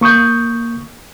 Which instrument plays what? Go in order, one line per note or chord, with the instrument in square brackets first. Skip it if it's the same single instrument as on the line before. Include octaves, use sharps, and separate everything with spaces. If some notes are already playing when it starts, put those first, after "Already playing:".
[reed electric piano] A#3 C#6 D#6 G6